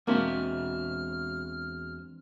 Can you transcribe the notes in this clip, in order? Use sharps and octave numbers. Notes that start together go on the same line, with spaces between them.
E2 G#3 A#3 C4 D4 F#4 E5 F6